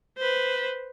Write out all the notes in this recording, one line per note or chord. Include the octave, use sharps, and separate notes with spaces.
B4 C5